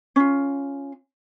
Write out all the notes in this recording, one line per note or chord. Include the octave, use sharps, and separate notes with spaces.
C#4 F4